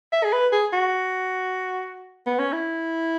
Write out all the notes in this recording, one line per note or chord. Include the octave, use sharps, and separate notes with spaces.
E5
G#4
B4
G#4
F#4
B3
C#4
E4